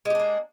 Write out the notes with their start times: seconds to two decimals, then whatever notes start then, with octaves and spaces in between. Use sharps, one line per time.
0.05 G#3
0.10 G4
0.15 D4
0.20 A#3